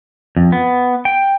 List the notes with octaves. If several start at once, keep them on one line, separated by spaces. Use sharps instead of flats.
F2
B3
G5